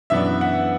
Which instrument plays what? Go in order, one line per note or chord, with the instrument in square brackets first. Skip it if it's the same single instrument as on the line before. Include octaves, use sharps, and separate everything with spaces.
[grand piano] F#2 E3 B3 D4 E5
F#5